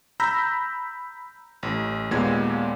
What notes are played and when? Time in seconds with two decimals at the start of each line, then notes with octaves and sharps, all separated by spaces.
0.20 A#5 B5 E6 G6 A#6 B6
1.63 A1
2.11 D#2 A#2 G#3 B3 G#6